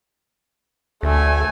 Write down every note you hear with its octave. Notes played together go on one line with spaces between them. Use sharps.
D2 A3 G#5